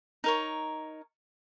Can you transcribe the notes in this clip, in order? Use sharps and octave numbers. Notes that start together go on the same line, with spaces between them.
D#4 A#4 C#5